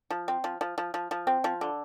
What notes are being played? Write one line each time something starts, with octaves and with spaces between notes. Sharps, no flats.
F3
C4
F3
F3
F3
F3
F3
C4
F3
D3